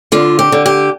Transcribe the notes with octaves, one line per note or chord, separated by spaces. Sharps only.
D3 F4
G4
D3
G4